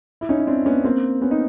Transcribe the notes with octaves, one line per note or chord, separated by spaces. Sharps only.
E4
C#4 D#4
D#4
C4 D4
B3 C#4
A#3 C4
B3 C#4
D#4